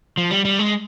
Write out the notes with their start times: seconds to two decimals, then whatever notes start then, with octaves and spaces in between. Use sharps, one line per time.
0.17 F3
0.31 G3
0.45 G3
0.59 G#3